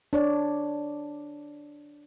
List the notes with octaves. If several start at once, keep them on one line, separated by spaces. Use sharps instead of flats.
D4 C#5 D5